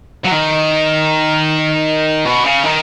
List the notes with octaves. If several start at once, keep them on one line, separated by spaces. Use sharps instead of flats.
F#3
D#3
B2
C#3
D#3